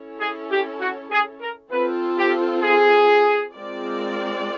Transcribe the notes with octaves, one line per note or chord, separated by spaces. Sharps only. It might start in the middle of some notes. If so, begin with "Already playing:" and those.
Already playing: C#4 E4 A4 C#5
G#4
G4
F#4
G#4
A#4
C4 F4 A4 B4
G4
G#4
G#3 C4 F4 A#4 D5